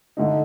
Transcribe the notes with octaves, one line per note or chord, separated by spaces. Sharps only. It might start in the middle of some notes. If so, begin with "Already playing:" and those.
D3 A3 D#4